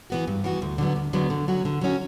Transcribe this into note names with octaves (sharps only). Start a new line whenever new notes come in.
E3 B3 F#4
G2
E3 B3 F#4
D2
D3 F#3 B3
D2
D3 F#3 B3
D3
F#3 C#4 F#4
D3
F#3 C#4 F#4